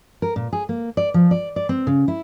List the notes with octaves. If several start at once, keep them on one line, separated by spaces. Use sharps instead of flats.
A#4
A#2
G#4
A#3
D5
F3
D5
D5
C4
C#3
E4